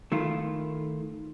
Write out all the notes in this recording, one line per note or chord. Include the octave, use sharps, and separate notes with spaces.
D#3 A3 E4 F4